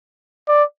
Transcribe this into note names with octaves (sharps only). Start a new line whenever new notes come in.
D5